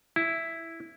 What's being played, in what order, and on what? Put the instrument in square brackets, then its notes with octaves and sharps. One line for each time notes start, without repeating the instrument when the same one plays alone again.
[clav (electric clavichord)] E4